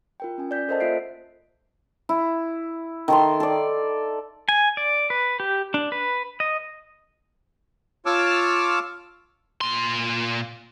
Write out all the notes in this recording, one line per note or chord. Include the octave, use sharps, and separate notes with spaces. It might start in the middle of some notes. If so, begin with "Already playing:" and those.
F4 A#4 G5
C#4 G#5
D5 G6 B6
A4 A#4 C5 D#5 F#5 A5
A#3 F4 E5 B6 C7 D7
E4
D#3 A4 C6
A4 D5
G#5
D5
B4
G4
D4
B4
D#5
F4 C#5 A5 D6 E6 F6
A#2 C6